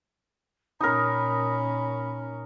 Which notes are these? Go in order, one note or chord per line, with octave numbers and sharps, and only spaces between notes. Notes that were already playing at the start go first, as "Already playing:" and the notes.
A#2 C#4 D#4 A#4 B5